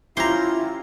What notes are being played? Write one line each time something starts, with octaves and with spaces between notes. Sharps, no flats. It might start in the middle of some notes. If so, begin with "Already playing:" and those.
C#4 E4 F4 G4 C5 A#5 C6